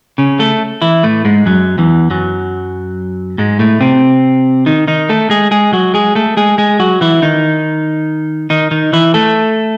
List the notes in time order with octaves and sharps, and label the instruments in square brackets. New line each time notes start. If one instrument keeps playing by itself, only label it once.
[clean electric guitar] C#3 C#4
A3 A4
E3 E4
A2 A3
G#2 G#3
F#2 F#3
E2 E3
F#2 F#3
G#2 G#3
A2 A3
C3 C4
D#3 D#4
D#3 D#4
A3 A4
G#3 G#4
G#3 G#4
F#3 F#4
G#3 G#4
A3 A4
G#3 G#4
G#3 G#4
F#3 F#4
E3 E4
D#3 D#4
D#3 D#4
D#3 D#4
E3 E4
A3 A4